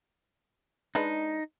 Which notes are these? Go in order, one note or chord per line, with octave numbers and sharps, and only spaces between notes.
G#3 D4 D#4 B4